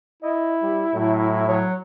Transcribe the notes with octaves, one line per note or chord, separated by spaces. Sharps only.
E4 D#5
G3
A2 F#3
F#3 C#5